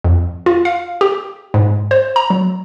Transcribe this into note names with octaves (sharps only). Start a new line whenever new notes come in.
F2
F4
F5
G4
G#2
C5
A#5
F#3